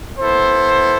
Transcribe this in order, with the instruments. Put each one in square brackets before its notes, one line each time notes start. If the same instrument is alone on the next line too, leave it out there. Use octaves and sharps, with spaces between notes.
[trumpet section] B3 E4 A4 C5